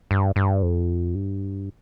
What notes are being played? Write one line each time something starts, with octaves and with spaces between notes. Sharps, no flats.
G2
G2
F2
G2